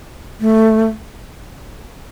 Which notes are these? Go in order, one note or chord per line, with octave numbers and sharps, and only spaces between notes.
A3